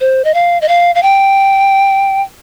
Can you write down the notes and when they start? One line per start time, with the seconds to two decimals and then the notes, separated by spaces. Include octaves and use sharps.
0.01 C5
0.24 D#5
0.34 F5
0.62 D#5
0.68 F5
0.95 F5
1.03 G5